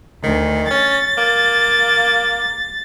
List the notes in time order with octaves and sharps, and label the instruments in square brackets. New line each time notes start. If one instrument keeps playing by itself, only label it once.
[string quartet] D2 [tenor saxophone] D#3
[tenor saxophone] C#4 [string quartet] A6
[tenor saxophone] A#3